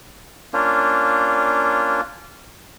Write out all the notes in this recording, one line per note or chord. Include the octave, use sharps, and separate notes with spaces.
A#3 C#4 D4 F4